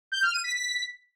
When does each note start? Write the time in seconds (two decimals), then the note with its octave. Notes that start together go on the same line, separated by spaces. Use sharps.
0.12 G6
0.22 F6
0.33 D#7
0.44 B6
0.55 B6